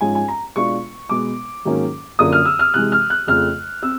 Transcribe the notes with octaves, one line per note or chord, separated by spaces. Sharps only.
G#2 F3 G#3 C#4 F4 G#5
G#5
A#5
B2 G#3 B3 D4 F4 C#6
B2 G#3 B3 D6
G#2 D#3 F#3 A#3 C#4
F#2 D3 F3 A#3 D#6
F6
E6
F6
C3 E3 G#3 F#6
F6
F#6
F2 C#3 F3 A3 F6
C4 E6